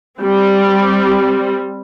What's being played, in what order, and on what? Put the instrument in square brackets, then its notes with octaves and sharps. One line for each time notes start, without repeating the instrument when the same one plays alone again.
[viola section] G3 C4